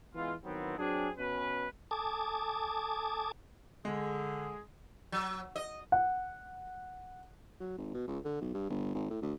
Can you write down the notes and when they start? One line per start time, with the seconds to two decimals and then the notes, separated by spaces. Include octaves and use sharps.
0.15 E3 G#3 B3 F4
0.44 D#3 E3 F#3 B3 C4
0.78 F#3 C4 D4 G#4
1.17 B2 C#4 B4
1.91 A4 G#5 A5 D6 D#6
3.85 D3 G#3 G#4
5.12 F#3
5.56 D#5
5.92 F#5
7.60 F#3
7.78 G#1
7.94 B2
8.07 C#2
8.24 D3
8.41 B1
8.54 G2
8.69 G1
8.95 G#1
9.10 A2
9.22 D2